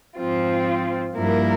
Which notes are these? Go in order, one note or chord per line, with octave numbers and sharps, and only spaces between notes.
G#2 F3 C4 F4
G2 F3 A#3 E4 A#4